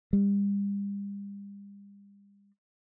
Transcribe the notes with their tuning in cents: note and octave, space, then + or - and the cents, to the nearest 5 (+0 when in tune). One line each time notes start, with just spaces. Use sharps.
G3 +40